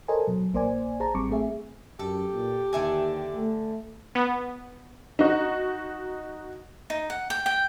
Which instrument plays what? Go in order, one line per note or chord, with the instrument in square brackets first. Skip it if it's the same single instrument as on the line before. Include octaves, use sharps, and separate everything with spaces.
[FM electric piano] A4 A#4 C5 C#5 D#5 G#5
B2 F#3
A#1 A#3 C5 D5 G#5
G#4 C5 A5 A#5
A1 G3 C4 C#6 D6
A3 C4 G#4 E5
[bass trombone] F#2 [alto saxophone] G4 [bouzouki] A4
[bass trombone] A#2
[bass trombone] D#2 [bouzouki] D3 E5 G#5
[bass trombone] A3
[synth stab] B3
[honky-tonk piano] D#4 F#4
[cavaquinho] D#4
F#5
G5
G5